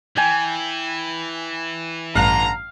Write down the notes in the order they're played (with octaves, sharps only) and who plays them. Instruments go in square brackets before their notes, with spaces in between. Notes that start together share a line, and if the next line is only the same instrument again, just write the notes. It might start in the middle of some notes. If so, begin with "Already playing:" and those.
[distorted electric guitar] E3 [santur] G5 G#5
[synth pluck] A1 G2 F#6 [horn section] D3 A#5 [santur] F5